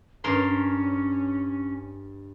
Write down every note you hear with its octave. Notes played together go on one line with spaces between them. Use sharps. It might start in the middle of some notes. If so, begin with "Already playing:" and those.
G2 C#4 A#4 C6